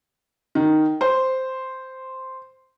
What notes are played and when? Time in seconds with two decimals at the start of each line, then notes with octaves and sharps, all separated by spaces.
0.55 D#3
1.01 C5